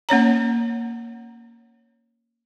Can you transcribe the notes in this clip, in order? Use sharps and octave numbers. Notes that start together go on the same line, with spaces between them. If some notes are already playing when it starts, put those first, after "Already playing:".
A#3 C#4 C#5 A#5